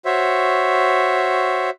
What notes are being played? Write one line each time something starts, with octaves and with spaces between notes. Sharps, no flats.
F#4 C5 C#5 E5